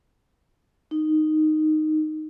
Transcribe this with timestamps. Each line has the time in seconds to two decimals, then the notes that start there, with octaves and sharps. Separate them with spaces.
0.91 D#4